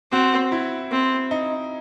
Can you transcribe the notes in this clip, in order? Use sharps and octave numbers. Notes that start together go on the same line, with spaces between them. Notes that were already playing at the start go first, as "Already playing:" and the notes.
C4 F#4
E4
C4
D#4